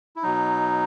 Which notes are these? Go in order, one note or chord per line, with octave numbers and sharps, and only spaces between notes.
E4
B2 F#3 D#4